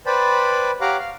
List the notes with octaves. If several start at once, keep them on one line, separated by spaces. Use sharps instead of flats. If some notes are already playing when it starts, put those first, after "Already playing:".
B4 C5 D5 G5 A5 B5
G4 C#5 F5 F#5 A#5 D6
F5